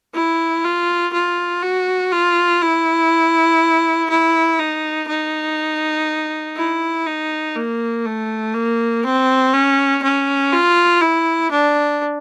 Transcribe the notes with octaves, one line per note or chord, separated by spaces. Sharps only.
E4
F4
F4
F#4
F4
E4
E4
D#4
D#4
E4
D#4
A#3
A3
A#3
C4
C#4
C#4
F4
E4
D4